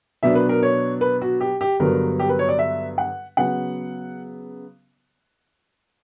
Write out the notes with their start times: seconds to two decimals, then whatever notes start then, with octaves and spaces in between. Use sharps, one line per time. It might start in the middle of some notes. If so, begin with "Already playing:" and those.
0.23 B2 F#3 B3 D4 E5
0.35 B4
0.49 A#4
0.63 C#5
1.01 B4
1.22 F#4
1.41 G4
1.61 G4
1.80 G2 D3 F#3 B3 A#4
2.19 G4
2.29 B4
2.39 C#5
2.49 D5
2.59 E5
2.98 F#5
3.37 C#3 F#3 B3 F#5